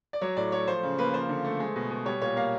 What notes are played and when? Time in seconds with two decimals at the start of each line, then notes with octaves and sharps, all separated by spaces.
0.13 D5
0.21 F#3 C#5
0.37 A2 D5
0.52 A3 C#5
0.67 F3 C5
0.83 C#3
0.98 A#3 B4
1.13 F3 C5
1.29 D3
1.45 A3
1.60 G#3
1.76 B2
1.91 B2
2.06 G3 C#5
2.22 A#2 C#5
2.36 A#3 F5